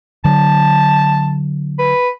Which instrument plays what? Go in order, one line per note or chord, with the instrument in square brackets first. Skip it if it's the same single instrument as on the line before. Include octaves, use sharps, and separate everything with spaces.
[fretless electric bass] D3 F#3 D4 [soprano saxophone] A5
[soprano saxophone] B4